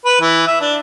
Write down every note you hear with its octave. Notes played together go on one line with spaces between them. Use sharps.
B4
E3
E5
D4